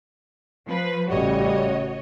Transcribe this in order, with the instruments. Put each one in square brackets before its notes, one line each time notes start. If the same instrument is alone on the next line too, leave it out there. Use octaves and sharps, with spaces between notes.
[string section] F3 B4
[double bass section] A1 C#3 [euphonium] G3 [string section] F#4 C#5 D#5